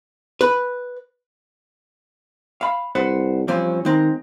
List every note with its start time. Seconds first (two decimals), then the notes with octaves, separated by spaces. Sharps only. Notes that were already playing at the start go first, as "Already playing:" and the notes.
0.41 B4
2.61 F5 B5
2.95 C2 B4 C5 F#5
3.48 G2 F3 C4 C#4
3.85 D#3 G#3 C4 A#5